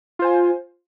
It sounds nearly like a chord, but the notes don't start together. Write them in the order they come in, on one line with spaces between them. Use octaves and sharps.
F4 C5 G#5